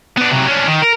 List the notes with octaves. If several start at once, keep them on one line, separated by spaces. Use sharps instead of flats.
B3 D4
C3 F#3
C#4 D4
D#3
A#4